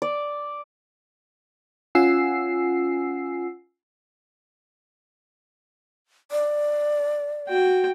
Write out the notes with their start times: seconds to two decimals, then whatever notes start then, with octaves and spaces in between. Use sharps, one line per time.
0.02 D5
1.95 C#4 F4 F#5 G#5 E6 C7
6.31 D5
7.48 F#4 G5